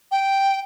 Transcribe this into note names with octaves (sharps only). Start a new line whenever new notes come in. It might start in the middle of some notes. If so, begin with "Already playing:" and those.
G5